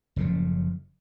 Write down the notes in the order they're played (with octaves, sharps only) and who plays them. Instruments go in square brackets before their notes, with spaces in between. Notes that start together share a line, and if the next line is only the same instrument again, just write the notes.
[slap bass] F#1 A2 C#3 F3